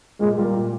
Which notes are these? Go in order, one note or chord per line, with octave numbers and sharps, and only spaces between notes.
A#2 G#3
G3 A#3 F4 A#4
A#2